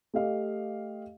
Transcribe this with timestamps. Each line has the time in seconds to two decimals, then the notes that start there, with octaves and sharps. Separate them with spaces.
0.14 A3 G4 D#5 F5